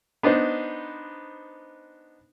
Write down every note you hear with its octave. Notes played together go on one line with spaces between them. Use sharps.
B3 D4 D#4 C5